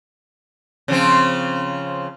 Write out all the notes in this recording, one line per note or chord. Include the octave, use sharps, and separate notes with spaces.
C#3 F3 C4